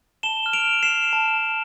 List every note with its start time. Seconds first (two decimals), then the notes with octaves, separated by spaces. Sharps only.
0.23 A5 E7 G7
0.46 F6
0.53 D7 F7
0.68 F6
0.83 C7 E7
0.90 F6
1.13 A5
1.35 A5